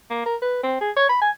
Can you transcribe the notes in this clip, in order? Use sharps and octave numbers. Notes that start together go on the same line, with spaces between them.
A#3
A#4
B4
C4
G#4
C#5
B5
G#5